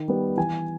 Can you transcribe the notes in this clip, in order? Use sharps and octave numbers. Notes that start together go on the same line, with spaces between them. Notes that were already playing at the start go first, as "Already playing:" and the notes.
Already playing: D#3
G3 B3
E3 G#5